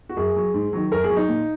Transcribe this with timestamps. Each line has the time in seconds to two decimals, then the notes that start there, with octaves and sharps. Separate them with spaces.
0.09 F#4
0.17 F#2 G#4
0.36 F#3
0.54 G#2
0.73 D#3 F#3
0.91 F#2 A#4
1.04 G#4
1.10 F#3
1.17 D#4
1.29 A#2